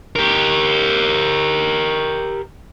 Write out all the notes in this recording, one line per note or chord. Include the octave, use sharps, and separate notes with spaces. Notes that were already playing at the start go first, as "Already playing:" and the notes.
G4 A#4